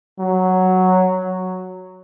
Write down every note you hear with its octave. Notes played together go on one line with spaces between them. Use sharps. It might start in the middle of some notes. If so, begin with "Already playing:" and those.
F#3